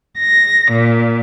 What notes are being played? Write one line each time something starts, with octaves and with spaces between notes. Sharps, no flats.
A#6
A#2